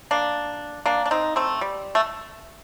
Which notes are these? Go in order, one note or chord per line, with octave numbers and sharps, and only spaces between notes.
A#3 D4
A#3 D4
D4
C4 D#4
A3 C4
G3
A3